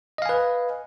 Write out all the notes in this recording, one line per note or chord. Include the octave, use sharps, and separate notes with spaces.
B4 D#5 F5 G#5